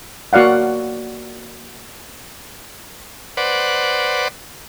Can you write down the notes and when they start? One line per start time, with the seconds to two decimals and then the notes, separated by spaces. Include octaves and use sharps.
0.33 A#3 F#4 D5 F5 F#5
3.37 B4 C5 D5 F#5